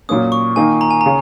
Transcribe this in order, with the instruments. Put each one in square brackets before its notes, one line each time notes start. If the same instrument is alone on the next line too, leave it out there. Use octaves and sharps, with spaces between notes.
[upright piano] A#2 F#3 A#3 C#4 [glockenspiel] D#6
[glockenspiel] C#6
[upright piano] D#3 A#3 D#4 [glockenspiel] G#5
[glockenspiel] A#5
G#5
[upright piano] C#3 [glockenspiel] A#5